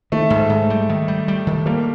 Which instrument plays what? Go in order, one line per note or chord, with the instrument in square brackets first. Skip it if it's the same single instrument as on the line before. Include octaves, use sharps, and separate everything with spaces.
[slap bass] D#3 [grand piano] A3
[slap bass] G#2
G#2
G3
D#3
G3
G3
D#3
[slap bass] G3 [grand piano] A#3